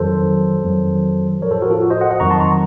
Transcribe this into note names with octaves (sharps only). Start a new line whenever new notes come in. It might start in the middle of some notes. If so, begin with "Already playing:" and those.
Already playing: F2 D#3 F#3 A4 C5
F2 D#3 F#3
A2 F3 A#4 C#5
A4 C5
F#4 A#4
F4 A4
F#4
C5 D#5
D#5 F#5
D#5 F#5
F2 D#3 F#3 A#5 C#6
A5 C6
A#5 C#6